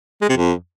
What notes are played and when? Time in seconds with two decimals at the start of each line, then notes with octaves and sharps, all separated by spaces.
0.22 G#3
0.29 C3
0.37 F2